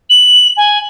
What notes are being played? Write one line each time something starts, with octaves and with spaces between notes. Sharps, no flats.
F#7
G#5